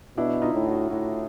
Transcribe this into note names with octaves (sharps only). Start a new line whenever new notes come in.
B2 D4 E4
D#4 F4
A2
E4 F#4
A2 E4 F#4